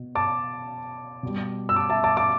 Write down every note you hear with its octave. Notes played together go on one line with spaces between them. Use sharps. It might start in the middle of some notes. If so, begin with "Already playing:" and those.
Already playing: B2
A5 D6
B2 G3
E6
A5 D6
E5 A5
A5 D6
A5 D6